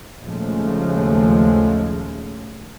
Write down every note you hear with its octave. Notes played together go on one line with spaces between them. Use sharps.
A#1 D#2 C#3 F3 G#3 A3